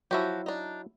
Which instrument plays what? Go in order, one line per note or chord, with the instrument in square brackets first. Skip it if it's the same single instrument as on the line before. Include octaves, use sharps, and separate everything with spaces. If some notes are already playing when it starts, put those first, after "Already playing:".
[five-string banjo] F3 F#4 G4 [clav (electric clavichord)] F#3 E4
[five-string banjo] D4 D#4